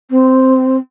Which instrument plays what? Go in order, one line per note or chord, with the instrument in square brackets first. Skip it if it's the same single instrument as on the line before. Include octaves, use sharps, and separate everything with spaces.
[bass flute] C4